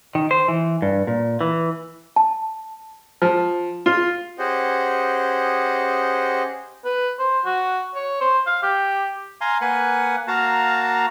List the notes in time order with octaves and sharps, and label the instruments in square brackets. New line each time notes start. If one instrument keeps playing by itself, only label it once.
[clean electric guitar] D#3
C5
E3
G2
A#2
E3
[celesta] A5
[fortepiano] F3
F4
[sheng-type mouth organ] C#4 G4 G#4 C5 D#5 F#5
[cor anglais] B4
C5
F#4
C#5
C5
F5
G4
[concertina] F5 G#5 A#5 C6
A#3 B4 F#5 G#5
A#3 F#4 F5 A5 A#5